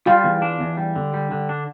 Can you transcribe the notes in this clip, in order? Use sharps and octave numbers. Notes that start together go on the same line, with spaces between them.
G3 F4
E2
D4
E2
G3
D3
G3
D3
D4